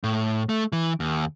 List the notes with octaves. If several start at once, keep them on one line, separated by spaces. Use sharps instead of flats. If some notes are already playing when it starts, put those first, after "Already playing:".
A2
A3
E3
D#2